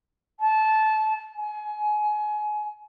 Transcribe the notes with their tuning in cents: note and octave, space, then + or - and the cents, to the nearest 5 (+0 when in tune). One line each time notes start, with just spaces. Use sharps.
A5 -20
G#5 +25